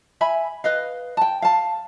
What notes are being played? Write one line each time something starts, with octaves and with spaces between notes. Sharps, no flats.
E5 G#5 B5
B4 D#5 F5
G5 A5
F5 A5